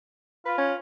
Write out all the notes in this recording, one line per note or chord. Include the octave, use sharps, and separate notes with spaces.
F4 B4
C#4